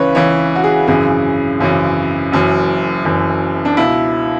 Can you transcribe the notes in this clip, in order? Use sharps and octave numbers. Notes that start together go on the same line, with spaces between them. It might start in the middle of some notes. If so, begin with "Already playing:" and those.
Already playing: C#2 C#3 E3 B4 C#5
C#2 C#3 E3 C#5
F#4
G#4
G#1 F#2 C#3 E3 G#4
G#1 F#2 C#3 E3
F#1 F#2 E3
F#1 F#2 E3
D4
C#2 B2 E4